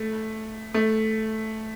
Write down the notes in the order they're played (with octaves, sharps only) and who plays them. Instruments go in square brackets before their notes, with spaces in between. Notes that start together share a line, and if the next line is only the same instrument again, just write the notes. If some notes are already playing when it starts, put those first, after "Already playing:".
Already playing: [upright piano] A3
A3